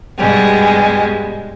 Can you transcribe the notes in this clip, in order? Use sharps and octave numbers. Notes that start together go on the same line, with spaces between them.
G2 B2 G3 G#3